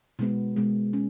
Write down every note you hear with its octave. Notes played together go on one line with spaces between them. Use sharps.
B2 G#3 B3
B2 G#3 B3
C#4